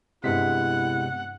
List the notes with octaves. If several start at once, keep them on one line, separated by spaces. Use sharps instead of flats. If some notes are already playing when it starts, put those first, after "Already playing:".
G2 C3 G#3 B3 E4 F#5 B6